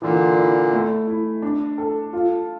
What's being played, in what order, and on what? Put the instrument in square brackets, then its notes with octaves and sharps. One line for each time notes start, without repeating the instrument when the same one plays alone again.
[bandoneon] A#2 D3 [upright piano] E3
[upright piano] E4
A3
E4
D4
A4
F4